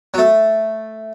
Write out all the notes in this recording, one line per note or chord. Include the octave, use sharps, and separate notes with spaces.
F#3
A3